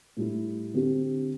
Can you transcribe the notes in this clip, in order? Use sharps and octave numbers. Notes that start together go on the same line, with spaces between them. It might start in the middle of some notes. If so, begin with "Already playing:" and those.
A2 G3 E4
D3 C4 G4